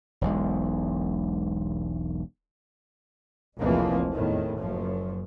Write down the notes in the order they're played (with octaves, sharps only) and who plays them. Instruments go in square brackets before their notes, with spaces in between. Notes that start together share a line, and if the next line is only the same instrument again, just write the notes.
[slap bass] E1 B1 G#3
[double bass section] F1 C#2 E3 F3 A#3
E2 A2 D#3
F#1 F#2 F3